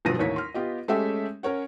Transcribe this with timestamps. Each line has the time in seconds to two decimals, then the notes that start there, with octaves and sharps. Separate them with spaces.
0.05 D#1 B1 G2 F3 A#6 D#7
0.19 A1 D#2 C#5 B6
0.36 C6 F6
0.54 B3 F4 G4 D#5
0.88 G#3 A3 C#4 G4 A4 E5
1.43 C#4 A#4 C#5 F#5